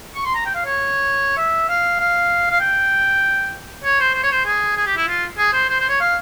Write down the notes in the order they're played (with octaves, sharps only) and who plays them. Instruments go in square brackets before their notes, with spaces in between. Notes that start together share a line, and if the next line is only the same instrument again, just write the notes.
[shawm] C#6
C6
A#5
G5
F5
C#5
E5
F5
F5
F5
G5
C#5
C5
C5
C#5
C5
G#4
G#4
G4
E4
F4
G#4
C5
C5
C5
C#5
F5